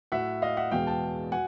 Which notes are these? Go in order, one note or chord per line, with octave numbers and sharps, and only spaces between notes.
A2 F#3 E5 F#5
D#5 F5
E5 F#5
E2 B2 G#3 F5 G5
G5 A5
F#3 F#5 G#5